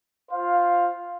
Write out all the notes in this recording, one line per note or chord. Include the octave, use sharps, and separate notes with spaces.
F4 C5 F5